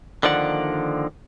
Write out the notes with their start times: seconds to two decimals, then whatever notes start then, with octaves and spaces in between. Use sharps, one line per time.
0.23 D3 D#3 F3 A#3 D5 F#5